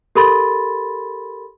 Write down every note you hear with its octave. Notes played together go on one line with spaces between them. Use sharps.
G4 A4 A#4 B5 C6 A6